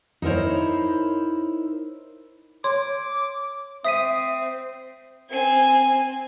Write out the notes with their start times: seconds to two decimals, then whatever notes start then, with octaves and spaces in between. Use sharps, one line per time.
0.22 D#4 E4 A#4 C5 C#5
2.64 C#5 C6 D6
3.84 C4 E5 D#6 B6 D#7
5.29 C4 G#5